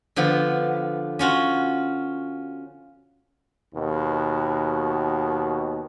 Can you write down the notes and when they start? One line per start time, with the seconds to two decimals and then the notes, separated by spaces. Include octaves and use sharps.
0.16 D3 F3 B3
1.19 C#4 F4 F#4
3.74 D#2 B2